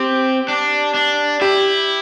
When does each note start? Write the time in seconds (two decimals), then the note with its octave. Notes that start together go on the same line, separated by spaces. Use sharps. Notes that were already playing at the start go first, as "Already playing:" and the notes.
Already playing: C4 G4
0.48 D4
0.94 D4
1.41 E4 G4